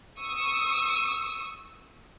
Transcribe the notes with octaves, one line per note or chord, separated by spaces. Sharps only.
C#6 D#6 E6